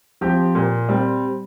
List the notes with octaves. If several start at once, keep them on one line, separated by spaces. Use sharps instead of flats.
F3 C4 G4
A#2
G3 C4